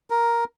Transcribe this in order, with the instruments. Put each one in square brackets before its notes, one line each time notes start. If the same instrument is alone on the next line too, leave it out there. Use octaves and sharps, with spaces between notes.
[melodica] A#4